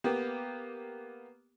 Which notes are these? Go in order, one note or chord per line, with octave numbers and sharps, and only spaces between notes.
A#3 B3 G4